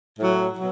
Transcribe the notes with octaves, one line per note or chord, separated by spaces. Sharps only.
A2 F#3
B2 F#3